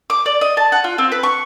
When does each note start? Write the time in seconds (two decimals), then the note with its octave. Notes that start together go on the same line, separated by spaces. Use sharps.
0.10 D6
0.26 D5
0.41 D#5
0.57 A5
0.72 F#5
0.84 F4
0.98 C4
1.12 B4
1.23 C#6